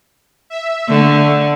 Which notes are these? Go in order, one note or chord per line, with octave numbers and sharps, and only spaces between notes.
E5
D3 A3